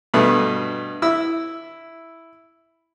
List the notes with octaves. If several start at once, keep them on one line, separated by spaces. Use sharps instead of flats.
G2 B2 A3 B3
E4 E6